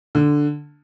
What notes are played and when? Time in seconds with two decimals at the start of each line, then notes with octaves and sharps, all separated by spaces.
0.15 D3